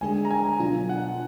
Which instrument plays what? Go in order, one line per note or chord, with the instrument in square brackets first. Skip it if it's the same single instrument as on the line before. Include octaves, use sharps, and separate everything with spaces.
[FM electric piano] D2 D3 G#3 D4 G#4 [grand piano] G#5
[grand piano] A#5
G#5
[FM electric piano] B2 F#3 D4 F4
[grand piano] F#5